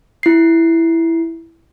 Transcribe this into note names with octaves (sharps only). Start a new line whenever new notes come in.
E4 C7